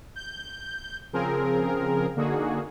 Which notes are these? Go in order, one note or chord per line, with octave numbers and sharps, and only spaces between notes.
G6
C#3 F3 C4 G#4 A#4
D3 A#3 D#4 F#4 G#4